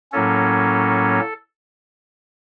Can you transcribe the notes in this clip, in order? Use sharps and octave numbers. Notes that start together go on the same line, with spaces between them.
A2 F#3 A#3 C#4 A4